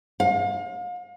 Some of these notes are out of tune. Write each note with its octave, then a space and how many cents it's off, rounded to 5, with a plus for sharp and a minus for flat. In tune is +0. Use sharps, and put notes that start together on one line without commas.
F5 +40